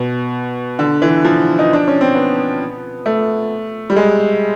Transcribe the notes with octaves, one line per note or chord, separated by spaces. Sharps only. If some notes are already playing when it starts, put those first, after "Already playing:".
Already playing: B2
D3
E3
F3
D#4
D4
C#4
C4
B3
A3
G3
G#3